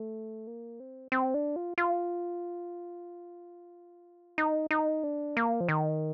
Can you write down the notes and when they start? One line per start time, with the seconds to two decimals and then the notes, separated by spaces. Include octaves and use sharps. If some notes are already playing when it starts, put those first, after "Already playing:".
Already playing: A3
0.47 A#3
0.80 C4
1.12 C4
1.34 D4
1.56 F4
1.78 F4
4.38 D#4
4.71 D#4
5.04 D4
5.37 A#3
5.61 F3
5.69 D#3